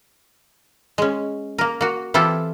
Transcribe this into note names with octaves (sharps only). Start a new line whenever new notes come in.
G#3 C#4
A#3 A#4
A#3 F#4
E3 C4 E4 F4 G4 A4